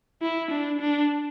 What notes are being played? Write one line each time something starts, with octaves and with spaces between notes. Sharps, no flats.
E4
D4
D4